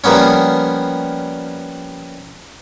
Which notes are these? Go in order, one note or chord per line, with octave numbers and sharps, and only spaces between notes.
F3 G3 A#3 B3 C#4